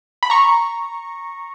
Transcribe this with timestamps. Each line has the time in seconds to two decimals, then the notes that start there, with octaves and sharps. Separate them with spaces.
0.23 B5
0.30 A#5 C#6